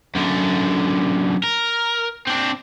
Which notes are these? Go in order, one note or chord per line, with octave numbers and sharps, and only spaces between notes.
F#2 D3
A#4
C4 D4